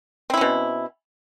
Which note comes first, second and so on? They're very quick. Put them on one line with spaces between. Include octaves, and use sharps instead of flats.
C4 E4 C#4 B2